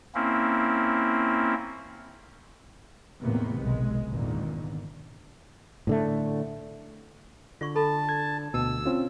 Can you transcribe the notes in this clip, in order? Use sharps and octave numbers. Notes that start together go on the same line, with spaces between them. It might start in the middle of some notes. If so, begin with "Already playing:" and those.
A#3 C4 C#4 E4
E2 A2 C3 D#3 A#3 B3
F1 B1 G#3
G#1 E2 A#2 D3 D#3
A2 D3 A3
D3 F4 D5 C#6
A4 A5 B5
G#6
D2 B2 G5 A5 E6
C4 C#4 F4